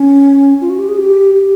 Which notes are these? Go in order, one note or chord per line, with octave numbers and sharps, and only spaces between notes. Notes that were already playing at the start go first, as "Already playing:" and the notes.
Already playing: C#4
F4
F#4
G4
G#4
G4
G4